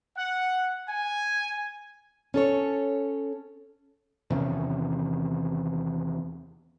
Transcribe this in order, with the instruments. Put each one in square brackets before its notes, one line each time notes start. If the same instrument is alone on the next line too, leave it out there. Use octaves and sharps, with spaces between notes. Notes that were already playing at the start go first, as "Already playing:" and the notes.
[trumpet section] F#5
G#5
[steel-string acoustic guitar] C#4 A4 C#5
[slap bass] E2 C3 D#3 C#4